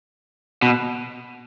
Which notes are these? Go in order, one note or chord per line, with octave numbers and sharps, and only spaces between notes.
B2